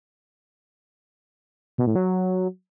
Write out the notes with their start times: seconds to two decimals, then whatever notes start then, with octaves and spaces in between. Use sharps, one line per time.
1.78 B2
1.87 A2
1.95 F#3